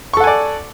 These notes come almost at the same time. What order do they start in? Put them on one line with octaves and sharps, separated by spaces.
C#6 A4 F#5 G#5 D5